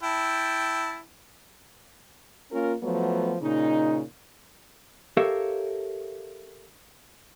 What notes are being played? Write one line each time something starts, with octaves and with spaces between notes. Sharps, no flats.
E4 G5 A5
A#3 C#4 F4 A#4
F3 F#3 A3 B3
A#2 C#3 D#4
G4 A4 A#4 C#5 E5 F5